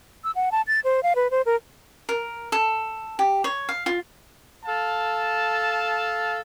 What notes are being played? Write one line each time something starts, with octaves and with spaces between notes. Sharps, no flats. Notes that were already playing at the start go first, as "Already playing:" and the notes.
E6
F#5
A5
A6
C5
F5
B4
C5
A#4
A#4
A4
G4
C#5
F5
F4
A4 F5 A5